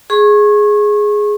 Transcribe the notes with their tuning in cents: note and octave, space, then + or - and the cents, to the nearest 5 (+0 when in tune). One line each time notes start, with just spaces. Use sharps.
G#4 +5 C#6 -30